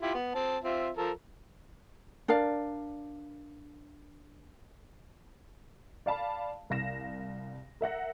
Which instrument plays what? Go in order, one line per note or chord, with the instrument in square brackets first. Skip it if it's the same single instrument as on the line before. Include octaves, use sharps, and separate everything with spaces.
[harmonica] E4 F4 G4
B3
C4 A5
C4 F4 E5
F3 A4 A#4
[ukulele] D4 A#4 D5 F5
[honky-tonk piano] D5 F5 A5 B5
C2 F5 A#6 E7
A#4 E5 F#5 A#6